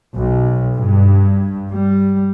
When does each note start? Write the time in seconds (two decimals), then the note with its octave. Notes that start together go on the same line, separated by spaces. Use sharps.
0.16 B1
0.76 G2
1.70 G3